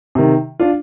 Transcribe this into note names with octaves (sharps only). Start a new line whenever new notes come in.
C3 D#3
D4 F4